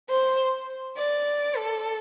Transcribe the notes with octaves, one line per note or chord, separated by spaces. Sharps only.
C5
D5
A4